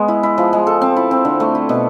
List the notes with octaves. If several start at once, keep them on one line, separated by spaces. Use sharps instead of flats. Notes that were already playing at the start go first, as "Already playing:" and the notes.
Already playing: G#3 B3
E4
E4
F3
G#3
A4
C4
E4
C4
D3
A3
E4
B2